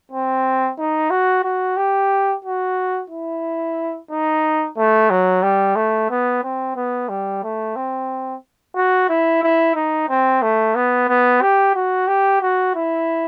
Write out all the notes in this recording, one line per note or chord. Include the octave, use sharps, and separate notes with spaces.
C4
D#4
F#4
F#4
G4
F#4
E4
D#4
A3
F#3
G3
A3
B3
C4
B3
G3
A3
C4
F#4
E4
E4
D#4
C4
A3
B3
B3
G4
F#4
G4
F#4
E4